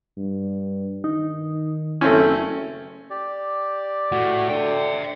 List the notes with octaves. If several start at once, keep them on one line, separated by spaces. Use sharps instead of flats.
G2
D#3 D#4
F#1 A3 C4 C#4 E4
G4 D5
A3 E4 F#4
D3 E5 G5